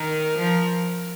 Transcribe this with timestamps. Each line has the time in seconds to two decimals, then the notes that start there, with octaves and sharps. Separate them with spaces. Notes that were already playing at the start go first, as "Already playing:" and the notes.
Already playing: D#3 A#4
0.37 F3